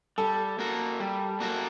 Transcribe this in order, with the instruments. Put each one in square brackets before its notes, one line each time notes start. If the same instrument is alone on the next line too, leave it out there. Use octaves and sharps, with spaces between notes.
[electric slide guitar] G3 [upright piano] A4
[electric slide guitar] A#3 F#4 A#4
G3
A#3 F#4 A#4